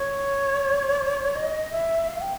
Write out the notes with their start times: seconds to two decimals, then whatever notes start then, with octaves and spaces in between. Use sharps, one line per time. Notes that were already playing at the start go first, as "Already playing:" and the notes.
Already playing: C#5
1.35 D#5
1.71 E5
2.08 F5
2.21 G5